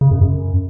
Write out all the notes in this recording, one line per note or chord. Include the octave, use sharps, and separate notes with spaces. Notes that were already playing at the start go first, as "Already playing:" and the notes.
C#3
F#2
F#2